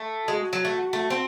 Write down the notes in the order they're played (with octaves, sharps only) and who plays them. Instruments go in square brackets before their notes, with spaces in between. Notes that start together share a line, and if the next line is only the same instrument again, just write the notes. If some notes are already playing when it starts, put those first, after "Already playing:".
Already playing: [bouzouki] A3
[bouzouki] G#3 [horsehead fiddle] F#4
[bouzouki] F#3
A3
A3
C4